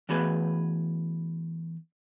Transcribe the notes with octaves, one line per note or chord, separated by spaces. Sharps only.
E3 A3 B3 F#4 G#4 B4